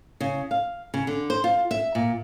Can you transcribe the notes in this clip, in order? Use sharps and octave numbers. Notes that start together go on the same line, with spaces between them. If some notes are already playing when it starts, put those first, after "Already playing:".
C#3
F5
C#3
D3
C5
F4
E5
A#2